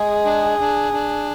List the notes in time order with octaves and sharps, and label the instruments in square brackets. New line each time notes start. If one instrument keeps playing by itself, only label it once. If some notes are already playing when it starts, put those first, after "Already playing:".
Already playing: [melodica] G#3 [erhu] G#4
[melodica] D4
D4
D4